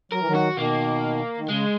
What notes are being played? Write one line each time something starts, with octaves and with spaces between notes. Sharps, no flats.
F#3 A#4
E3
D#3 F#3
F#4
B2 D#3 A#3
D#3
C#3 G#3